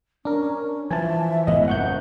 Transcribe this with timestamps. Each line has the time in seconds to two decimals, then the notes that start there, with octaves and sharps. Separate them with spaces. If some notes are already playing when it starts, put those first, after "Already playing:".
0.25 C#4 D4 A#4
0.91 E3 F3 E5 G#5 A5
1.47 A1 G#2 B3 D#5
1.68 F#1 F2 F#5 C#6 G6